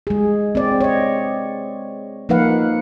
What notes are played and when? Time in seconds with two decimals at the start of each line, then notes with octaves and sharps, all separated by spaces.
0.07 G#3 G#4
0.55 C4 D5
0.81 C#5 D#5
2.29 F3 A#3 D#4 B4 F5 F#5